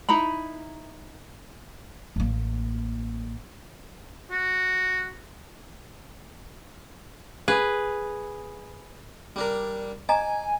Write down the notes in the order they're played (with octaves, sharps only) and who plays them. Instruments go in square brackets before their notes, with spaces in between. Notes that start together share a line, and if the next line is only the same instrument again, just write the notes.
[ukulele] D#4 E4 A#5 B5
[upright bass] A1 A#3
[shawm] F#4
[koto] G#4 B4
[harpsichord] G3 D4 A#4
[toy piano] D#5 A#5 [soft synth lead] G#5 [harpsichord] D6